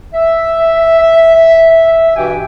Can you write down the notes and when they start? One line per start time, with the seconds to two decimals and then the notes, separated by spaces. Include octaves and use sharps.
0.14 E5
2.16 G2 B2 E3 G4 G5 G#5